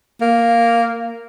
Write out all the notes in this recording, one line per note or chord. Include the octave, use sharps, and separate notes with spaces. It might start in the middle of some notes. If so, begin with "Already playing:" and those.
A#3